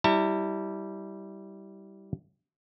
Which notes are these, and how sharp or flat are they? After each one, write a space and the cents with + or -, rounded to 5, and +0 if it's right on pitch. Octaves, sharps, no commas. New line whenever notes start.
G3 -10 E4 -20 A5 +40